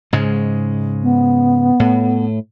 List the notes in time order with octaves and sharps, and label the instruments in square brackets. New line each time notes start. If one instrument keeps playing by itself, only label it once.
[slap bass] G#2 C#3 G#3
[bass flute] B3
[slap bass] A2